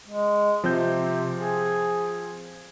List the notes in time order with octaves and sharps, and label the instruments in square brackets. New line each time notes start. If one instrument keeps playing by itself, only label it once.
[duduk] G#3
[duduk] C3 [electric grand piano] F3 C4 G6
[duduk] G#4